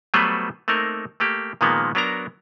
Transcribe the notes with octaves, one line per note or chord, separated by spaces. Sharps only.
F#3 G3 A3 B3 B4 C5
A3 A#3 C4 D#4 A#4
A3 A#3 G4
A#2 D#3 F3 G#3 A#3 B3
F#3 B3 D4 A#4 A#5